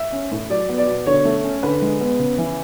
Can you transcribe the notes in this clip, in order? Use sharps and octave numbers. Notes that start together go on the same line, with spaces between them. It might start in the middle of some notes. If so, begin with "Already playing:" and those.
Already playing: E5
C#4
A2
F#3 D5
B3
D5
B2
D3 C#5
A3
C#4
D3 B4
G#3
B3
C#3
E3